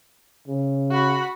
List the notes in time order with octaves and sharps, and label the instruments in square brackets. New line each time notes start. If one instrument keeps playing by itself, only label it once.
[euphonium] C#3
[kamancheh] F#4 B5